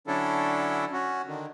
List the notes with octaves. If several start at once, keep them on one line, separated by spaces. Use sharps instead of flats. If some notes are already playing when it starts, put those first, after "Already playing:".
D3 F#3 C#4 D4 E4 A4
C#4 F#4
D3 D#3